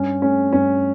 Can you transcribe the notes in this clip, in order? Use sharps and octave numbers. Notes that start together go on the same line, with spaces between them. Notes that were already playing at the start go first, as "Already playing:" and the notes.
Already playing: G2 C#4
A3 C#4
G2 C#4